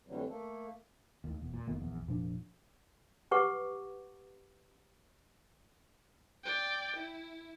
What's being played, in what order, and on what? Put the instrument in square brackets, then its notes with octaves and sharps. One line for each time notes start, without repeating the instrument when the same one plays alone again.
[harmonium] F2 A2 D3 E3 F#3 G3
A3 A#3 A4
[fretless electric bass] D#2 A2
E1 E2
A#2
F#1 D#3 A#3 B3
A#1 E2
F1 A#2 F3 D4
[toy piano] G4 B4 F#5 C#6 D6
[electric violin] D5 G5
E4